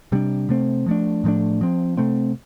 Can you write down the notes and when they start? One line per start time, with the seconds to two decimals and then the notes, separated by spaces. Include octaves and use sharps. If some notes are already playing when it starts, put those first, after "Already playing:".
0.12 C3 G3 D4
0.49 C3 A3 C4
0.86 F3 A3 D4
1.24 A2 F3 A3 D4
1.61 F3 C4
1.97 C3 A3 C4